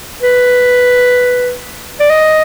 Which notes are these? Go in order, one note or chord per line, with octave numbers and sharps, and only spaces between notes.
B4
D5
D#5